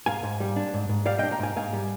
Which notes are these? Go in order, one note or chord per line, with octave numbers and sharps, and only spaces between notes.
G#2 F5 G#5
G#2
G3
D4
G#2
G#2
G3 D5 F5
D4 D#5 G5
G5 A#5
G#2 F5 G#5
G#2 F5 G#5
G3